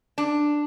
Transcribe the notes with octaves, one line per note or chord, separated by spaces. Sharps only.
D4